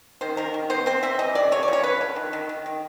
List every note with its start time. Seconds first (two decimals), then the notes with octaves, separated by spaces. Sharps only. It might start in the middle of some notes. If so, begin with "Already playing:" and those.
0.21 D#3 C5
0.37 D#3 A#4
0.54 D#3
0.70 B3 C5
0.86 C4 C5
1.03 C4 E5
1.19 E3 D#5
1.35 C3 D5
1.52 D3 C#5
1.63 D5
1.68 F3
1.73 C#5
1.83 F3 B4
2.01 D3
2.16 D#3
2.33 D#3
2.49 D#3
2.66 D#3